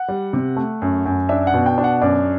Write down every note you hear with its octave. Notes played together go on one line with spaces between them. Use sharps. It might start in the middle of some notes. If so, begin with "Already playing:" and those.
Already playing: F#5
G3
C3
A3
F#2
F#2
D4 E5
F#5
B2
G5
D4
F#5
F#2 D5